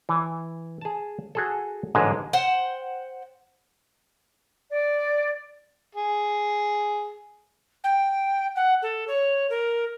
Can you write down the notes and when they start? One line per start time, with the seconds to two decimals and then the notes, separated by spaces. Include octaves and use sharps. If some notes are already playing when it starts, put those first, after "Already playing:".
0.09 E3
0.81 G#4 A5
1.35 F#4 G#4 A4
1.95 A1 G#2 D3 G#3
2.33 C5 F#5 G5
4.70 D5
5.95 G#4
7.84 G5
8.56 F#5
8.82 A4
9.07 C#5
9.50 A#4